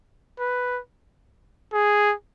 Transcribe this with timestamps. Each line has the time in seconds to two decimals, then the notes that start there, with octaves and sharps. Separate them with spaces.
0.39 B4
1.73 G#4